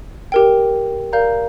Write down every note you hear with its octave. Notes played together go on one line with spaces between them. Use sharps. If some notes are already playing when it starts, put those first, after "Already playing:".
G4 A#4 G5
A#4 D5 F5 A#5 G6